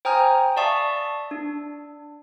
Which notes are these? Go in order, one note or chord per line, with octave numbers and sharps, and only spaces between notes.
C5 G5 G#5 A#5 D#6 F6
D5 E5 F5 A5 C#6 D#6
D4